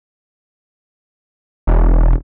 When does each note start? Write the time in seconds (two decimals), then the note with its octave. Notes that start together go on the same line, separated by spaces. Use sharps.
1.67 E1